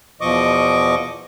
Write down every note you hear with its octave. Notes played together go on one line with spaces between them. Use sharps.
E2 B2 F3 D#5 C#6 D6